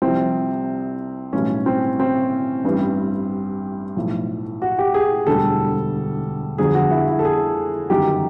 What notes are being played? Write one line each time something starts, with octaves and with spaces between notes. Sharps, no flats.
C2 C3 F3 C4
B1 A2 E3 G3 C#4
C4
C4
A1 G2 E3 G3
B1 A2 F3
F#4
G4
G#4
E1 D2 D3 G3 A4
G1 F2 D3 F#3 G#4
F#4
E4
E4
A4
G#4
G1 F#2 D#3 F#3 G4